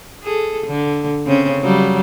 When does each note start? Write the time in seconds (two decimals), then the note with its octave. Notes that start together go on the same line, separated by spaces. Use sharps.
0.23 G#4 A4
0.66 D3
1.26 C#3 C4 C#4
1.62 C#3 F#3 G3